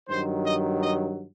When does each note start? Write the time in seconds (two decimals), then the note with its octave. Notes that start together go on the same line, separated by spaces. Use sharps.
0.09 G2 D#3 F#3 C5
0.45 D#5
0.82 D#5